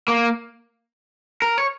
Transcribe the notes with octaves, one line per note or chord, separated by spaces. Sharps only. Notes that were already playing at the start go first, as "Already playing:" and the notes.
A#3
A#4
C#5